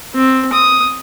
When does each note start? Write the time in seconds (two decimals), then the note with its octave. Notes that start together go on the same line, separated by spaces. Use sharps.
0.15 C4
0.53 D#6